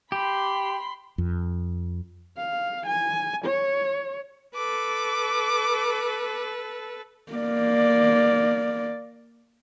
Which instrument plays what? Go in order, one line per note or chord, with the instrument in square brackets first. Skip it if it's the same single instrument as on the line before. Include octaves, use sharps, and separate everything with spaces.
[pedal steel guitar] G4 [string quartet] B5 C6
[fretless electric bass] F2
[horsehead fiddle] F5
G#5
C#5
[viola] A4 B4 [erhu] D6
[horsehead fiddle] A#3 D5